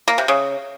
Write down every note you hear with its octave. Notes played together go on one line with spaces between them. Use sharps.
A#3
C3
C#3